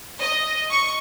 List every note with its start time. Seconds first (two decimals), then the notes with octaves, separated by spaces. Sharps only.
0.20 D#5
0.70 C#6